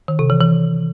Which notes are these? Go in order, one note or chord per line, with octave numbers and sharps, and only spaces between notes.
D#3
C3
E3
E3